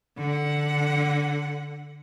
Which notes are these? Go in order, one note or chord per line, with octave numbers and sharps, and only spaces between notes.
D3 F#5